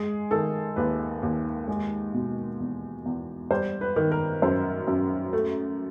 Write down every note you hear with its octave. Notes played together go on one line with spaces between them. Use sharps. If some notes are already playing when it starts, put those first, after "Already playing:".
Already playing: G#3 G#4
D#3 A4
D#2 B4
D#2
G#3
B2
E2
E2
G3 C5
B4
D#3
A#4
F#2 C5
F#2
A3